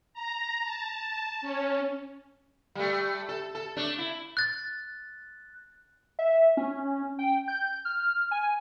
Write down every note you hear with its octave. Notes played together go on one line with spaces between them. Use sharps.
A#5
A5
C#4
G3 A3
A4
A4
A3 D4
E4
F#6 A6
E5
C#4
G5
G6
F6
G#5